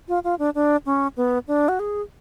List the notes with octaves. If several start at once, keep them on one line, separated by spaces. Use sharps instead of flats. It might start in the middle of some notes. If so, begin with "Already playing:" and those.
F4
F4
D4
D4
C#4
B3
D4
F#4
G#4